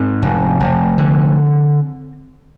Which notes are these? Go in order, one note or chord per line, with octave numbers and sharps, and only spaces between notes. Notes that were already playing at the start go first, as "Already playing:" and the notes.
Already playing: G#2 C4
F1
F1
D3